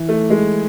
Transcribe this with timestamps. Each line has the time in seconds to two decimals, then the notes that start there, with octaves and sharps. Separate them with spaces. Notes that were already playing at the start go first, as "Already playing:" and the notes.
Already playing: E3
0.09 A3
0.30 G#3